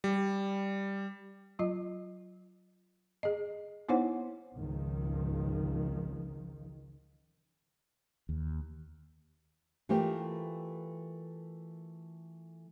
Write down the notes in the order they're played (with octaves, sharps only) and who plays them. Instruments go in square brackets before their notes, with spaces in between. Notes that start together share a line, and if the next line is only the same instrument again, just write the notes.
[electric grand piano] G3
[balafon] F#3 F4 D#5
G#4 D#5
B3 D#4 E4 C5 C#5 F#5
[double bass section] G#1 C#2 D#3 F3
[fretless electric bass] D#2
[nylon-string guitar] E3 A3 F4 G4 A#4 C5